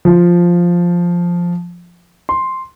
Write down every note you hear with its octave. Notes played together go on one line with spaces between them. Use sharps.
F3
C6